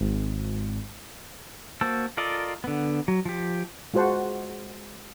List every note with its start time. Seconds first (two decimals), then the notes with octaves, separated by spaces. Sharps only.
0.01 G#1
1.81 A#3 F#4 C5 A5 E6
2.17 F4 A4 A#4 D5 D#5
2.64 D3 B3
3.08 F#3
3.25 F3 G4
3.94 G#3 F4 F#4 C5 F#5 A5